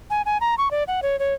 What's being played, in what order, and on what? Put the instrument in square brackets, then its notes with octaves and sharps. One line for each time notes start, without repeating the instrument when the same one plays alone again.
[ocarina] G#5
G#5
A#5
C#6
D5
F#5
C#5
C#5